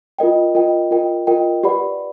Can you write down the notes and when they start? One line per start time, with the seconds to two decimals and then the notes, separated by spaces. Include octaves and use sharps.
0.19 F4 A#4 D#5 G5
0.55 F4 A#4 D#5 G5
0.91 F4 A#4 D#5 G5
1.27 F4 A#4 D#5 G5
1.63 G4 B4 D5 F#5 B5